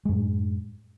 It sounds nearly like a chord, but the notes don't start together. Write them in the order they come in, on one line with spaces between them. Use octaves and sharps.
G#3 F#2 A2